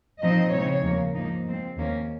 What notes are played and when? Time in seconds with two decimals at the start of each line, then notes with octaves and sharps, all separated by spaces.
0.22 A#2 F3 C4 D#4 D#5
0.53 C#3 G#3 C4 D#4 C#5
0.83 D#2 C#3 F3 A#3
1.14 G#2 F3 A#3 D#4
1.44 G#2 F3 G#3 C4
1.76 D#2 D#3 A#3 C#4